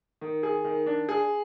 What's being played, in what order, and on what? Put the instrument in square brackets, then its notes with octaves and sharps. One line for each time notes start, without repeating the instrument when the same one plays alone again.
[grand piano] D#3
G#4
D#3
D4
G#4